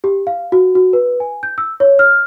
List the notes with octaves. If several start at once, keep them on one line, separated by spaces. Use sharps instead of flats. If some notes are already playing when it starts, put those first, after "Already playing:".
G4
F5
F#4
F#4
B4
G#5
G6
E6
C#5
F6